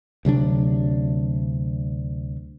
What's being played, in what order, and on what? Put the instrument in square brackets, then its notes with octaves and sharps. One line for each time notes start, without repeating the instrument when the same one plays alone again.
[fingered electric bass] D2 C3 F#3 D4